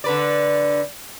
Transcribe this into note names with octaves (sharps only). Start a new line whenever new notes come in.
D3 B4 D5